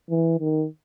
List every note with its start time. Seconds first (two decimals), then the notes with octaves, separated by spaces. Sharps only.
0.10 E3
0.39 D#3